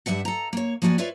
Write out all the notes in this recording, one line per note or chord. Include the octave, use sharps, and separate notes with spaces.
G2 D#3 G3 E5 F#5
A4 A#5
A#3 C#5
F3 A#3 F#4 D5 G#5
F4 B4 C#5 D5 E5 F5